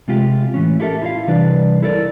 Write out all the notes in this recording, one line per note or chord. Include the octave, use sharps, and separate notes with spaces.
C3 G#3 F4 G4
A2 E3 C#4
E4 G4 A4 A#4 E5
E4 F4 D#5 F5
C2 E3 G3 D4 B4 D5
E4 A4 A#4 D5